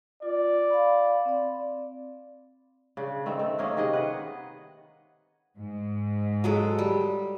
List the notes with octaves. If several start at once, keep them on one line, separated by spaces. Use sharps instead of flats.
F4 D5
F5 B5
C4 D5
C#3 D4
D#3 A3 C4
A3
D#3 A#3 C#4 G#4
C3 D#3 G#4 D#5
B4 F#5
G#2
F#3 G#3 A4
G3